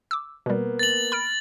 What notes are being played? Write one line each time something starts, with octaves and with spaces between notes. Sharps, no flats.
D6 E6
B2 G3 A#3 B3
A6 F#7
B5 F6 D7